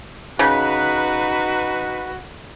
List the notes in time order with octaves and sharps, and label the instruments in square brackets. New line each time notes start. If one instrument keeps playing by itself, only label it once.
[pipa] C#3 [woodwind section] D#4 B4 [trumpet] F#4